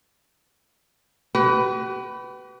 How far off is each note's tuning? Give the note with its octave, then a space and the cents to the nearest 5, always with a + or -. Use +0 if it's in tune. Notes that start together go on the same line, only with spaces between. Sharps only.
G4 -45 B4 +10